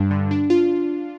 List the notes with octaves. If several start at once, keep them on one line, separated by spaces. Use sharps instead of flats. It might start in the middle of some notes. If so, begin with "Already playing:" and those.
Already playing: G2 G3 D4
D3
D4
F4